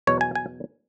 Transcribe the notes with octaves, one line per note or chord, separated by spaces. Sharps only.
E2 B2 F#3 C#5
G#5
G#5